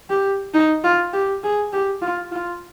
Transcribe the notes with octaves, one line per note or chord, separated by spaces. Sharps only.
G4
D#4
F4
G4
G#4
G4
F4
F4